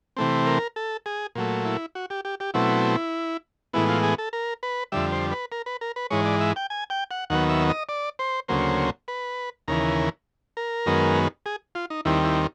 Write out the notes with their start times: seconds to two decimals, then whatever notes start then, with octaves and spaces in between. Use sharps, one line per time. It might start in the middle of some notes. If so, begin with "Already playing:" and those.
0.17 C3 E3 A3 C4
0.47 A#4
0.76 A4
1.06 G#4
1.35 A#2 F#3 A3
1.65 E4
1.95 F#4
2.10 G4
2.25 G4
2.40 G4
2.54 B2 F#3 A3 C4 E4
3.73 A2 E3 G#3 B3 E4
3.89 F4
4.03 G#4
4.18 A4
4.33 A#4
4.63 B4
4.92 F2 D3 G3 E5
5.12 C5
5.32 B4
5.52 A#4
5.66 B4
5.81 A#4
5.96 B4
6.10 G#2 E3 G#3 C#5
6.26 D5
6.41 E5
6.56 G5
6.70 G#5
6.90 G5
7.11 F#5
7.30 D#2 D#3 F#3 B3 F#5
7.50 E5
7.70 D#5
7.89 D5
8.19 C5
8.48 D2 C#3 F#3 A#3 C5
9.08 B4
9.68 D#2 C#3 E3 A#4
10.57 A#4
10.86 F#2 D#3 G#3 B3
11.46 G#4
11.75 F4
11.90 D#4
12.05 D#2 D#3 G3 C4 E4
12.25 E4